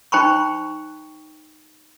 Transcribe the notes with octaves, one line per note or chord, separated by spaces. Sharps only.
D#4 C5 G5 A#5 B5 C#6